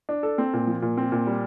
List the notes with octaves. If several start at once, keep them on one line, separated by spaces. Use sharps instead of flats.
D4
A4
C4
A#2
F3
A#2
C4
A#2
G3